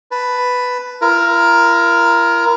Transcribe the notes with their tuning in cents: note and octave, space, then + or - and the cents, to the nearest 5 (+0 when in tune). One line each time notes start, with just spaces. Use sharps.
B4 +5 A5 +0
F4 -45 A#4 +10